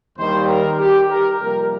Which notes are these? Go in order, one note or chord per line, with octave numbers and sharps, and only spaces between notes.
D#2 D#3 G3 C5
A#4
G4
A#4
F2 C3 G3 A#3 A#4